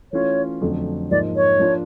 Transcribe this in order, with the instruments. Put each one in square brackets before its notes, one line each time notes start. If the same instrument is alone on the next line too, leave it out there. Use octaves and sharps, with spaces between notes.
[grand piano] E3 A3 C#4 F4 [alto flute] C#5
[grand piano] F2 D3 F#3 A3
[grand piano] G#2 F3 A#3 D#4 [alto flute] D5
[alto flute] C#5
[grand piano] F3 A#3 D4 F4